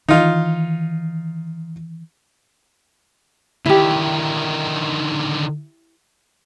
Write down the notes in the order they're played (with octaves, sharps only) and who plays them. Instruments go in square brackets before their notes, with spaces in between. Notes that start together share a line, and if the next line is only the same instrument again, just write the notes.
[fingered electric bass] D#3 E3 [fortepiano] D#4 F4
[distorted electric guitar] D3 D#3 [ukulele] E4 G4